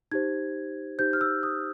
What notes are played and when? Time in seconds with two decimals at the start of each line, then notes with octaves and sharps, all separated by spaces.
0.12 D#4 G4 C5 G#6
0.99 D#4 G4 C5 G6
1.13 F6
1.21 E6
1.43 D#6